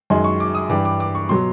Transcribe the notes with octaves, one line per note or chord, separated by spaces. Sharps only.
F#2 D#3 G#3 C6
C#6
D6
D#6
G2 E3 G3 D6
D6
D6
C#6
B2 F#3 C6